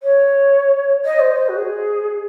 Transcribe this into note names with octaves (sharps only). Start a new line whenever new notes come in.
C#5
D#5
C5
C5
F#4
G#4